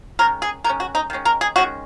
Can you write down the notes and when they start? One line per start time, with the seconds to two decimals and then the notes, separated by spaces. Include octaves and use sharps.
0.19 D#3 G#3 C#4 A#4
0.42 G#4
0.64 D#3 G#3 C#4 A#4
0.80 F#4
0.95 D#4
1.10 D#3 G#3 C#4
1.25 A#4
1.41 G#4
1.56 D#3 G#3 C#4 F#4